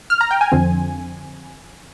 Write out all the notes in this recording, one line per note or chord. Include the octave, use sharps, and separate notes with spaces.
F6
A#5
G5
G#5
F2 D3 F3 C4